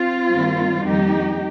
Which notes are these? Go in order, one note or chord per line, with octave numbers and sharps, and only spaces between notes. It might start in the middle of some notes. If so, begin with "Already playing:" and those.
Already playing: C4 F4
G2 D#3 G3 A#3
F2 D#3 G3 A#3 D#4 G4